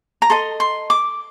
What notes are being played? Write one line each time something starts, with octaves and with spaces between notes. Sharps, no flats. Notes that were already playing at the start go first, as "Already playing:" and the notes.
A#5
A4 D#5 C6
C6
D6